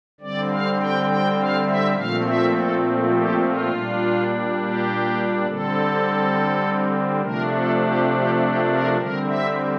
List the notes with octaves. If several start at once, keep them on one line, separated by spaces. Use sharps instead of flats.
D3 G3 C4 D5
F5
G5
G5
F5
E5
A#2 F3 A3 C4 F5
E5
A4
G4
F4
A#2 G3 D4
G4
D3 G3 C4 A4
C3 F3 A3 D4 A#4
A4
G4
G4
G4
A#4
D3 G3 C4 A#4
E5